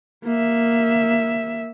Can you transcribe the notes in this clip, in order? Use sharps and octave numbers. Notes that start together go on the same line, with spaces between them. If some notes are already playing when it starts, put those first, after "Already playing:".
A#3 E5